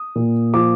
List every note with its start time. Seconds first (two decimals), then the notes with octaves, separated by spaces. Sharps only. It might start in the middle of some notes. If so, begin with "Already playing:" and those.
Already playing: D#6
0.15 A#2
0.54 F3 D6